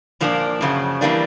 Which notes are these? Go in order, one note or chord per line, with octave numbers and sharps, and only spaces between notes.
A#2 F3 A#3 D4
F#2 C#3 F3
E3 G3 A#3 D4